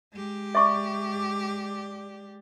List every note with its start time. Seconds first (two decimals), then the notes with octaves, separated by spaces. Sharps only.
0.13 G#3 G4
0.55 D5 E5 C#6